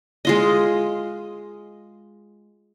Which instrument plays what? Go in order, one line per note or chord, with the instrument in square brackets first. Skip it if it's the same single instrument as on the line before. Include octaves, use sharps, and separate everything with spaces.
[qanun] G#3 F4 D#5